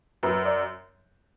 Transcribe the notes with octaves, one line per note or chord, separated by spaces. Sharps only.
F#2 B4
D5